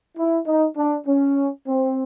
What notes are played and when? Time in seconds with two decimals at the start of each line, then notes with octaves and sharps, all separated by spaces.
0.18 E4
0.47 D#4
0.77 D4
1.06 C#4
1.68 C4